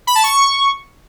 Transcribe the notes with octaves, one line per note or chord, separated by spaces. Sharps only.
B5
A5
C#6